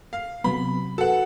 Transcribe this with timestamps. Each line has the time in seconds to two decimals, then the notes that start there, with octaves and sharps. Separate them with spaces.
0.13 F5
0.44 C3 F#3 B3 B5
0.98 F#4 A4 B4 F#5